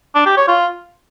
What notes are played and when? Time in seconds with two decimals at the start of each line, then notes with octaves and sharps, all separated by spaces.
0.15 D4
0.26 G4
0.37 C#5
0.48 F4